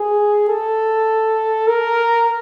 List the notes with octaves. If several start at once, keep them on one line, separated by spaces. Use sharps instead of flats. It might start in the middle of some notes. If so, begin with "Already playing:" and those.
Already playing: G#4
A4
A#4